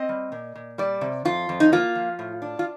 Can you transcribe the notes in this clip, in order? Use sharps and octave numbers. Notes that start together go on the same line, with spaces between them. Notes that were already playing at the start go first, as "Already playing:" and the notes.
Already playing: C4 D#5
G3
A#2
A#2
G3 D5
C3
F2 F4
F2
D#4
A#3 F4
F3
A2
D4
F4